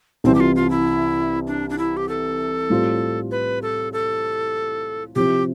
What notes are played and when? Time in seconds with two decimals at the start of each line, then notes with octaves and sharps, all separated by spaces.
0.24 C2 C3 E3 C4
0.35 G4
0.40 F4
0.56 F4
0.70 E4
1.47 D4
1.70 D4
1.78 E4
1.97 G4
2.09 A4
2.70 A2 G3 C4 F4
3.31 B4
3.62 A4
3.93 A4
5.15 C3 F3 C4 E4 G4